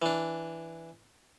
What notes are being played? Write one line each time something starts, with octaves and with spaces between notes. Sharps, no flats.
E3 D4